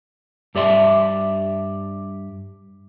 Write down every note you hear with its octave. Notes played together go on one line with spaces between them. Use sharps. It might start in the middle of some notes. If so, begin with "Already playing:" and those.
G2 G4 D5 E5 C6